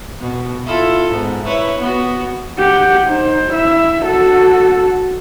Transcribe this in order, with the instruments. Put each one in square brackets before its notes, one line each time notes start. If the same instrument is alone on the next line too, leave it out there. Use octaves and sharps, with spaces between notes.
[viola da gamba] B2
E4 F4 A4
G#2 B3
E4 B4 C#5
B3 F#4
[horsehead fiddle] G4 F#5
D#4 C5
E4 E5
F#4 A4